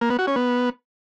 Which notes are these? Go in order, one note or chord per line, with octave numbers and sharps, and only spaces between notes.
A#3
B3
F#4
C#4
B3